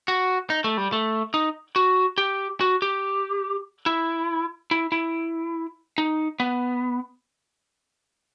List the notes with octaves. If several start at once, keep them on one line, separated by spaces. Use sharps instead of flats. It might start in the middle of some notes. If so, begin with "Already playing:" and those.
F#4
D#4
A3
G3
A3
D#4
F#4
G4
F#4
G4
E4
E4
E4
D#4
B3